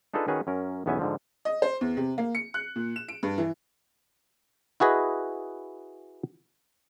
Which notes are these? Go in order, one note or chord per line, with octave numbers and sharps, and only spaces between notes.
D4 D#4 F4 G#4 A4 B4
D#3 C#4 F#4 G#4 B4 C#5
F#2 C#4 A#4
B1 E2 B3 C#4 E5 G#5
G#2 D3 F3
D#5
C5
E2
C3
A#3
C#7
F#6
A#2
E7
D7
G2
E3
E4 F#4 G#4 B4 D#5